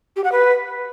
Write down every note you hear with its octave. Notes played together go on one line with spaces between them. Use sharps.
G4
F#5
B4